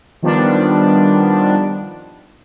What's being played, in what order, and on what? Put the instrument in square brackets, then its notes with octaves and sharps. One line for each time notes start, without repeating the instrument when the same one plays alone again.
[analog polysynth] D#3 F3 G3 B3 D4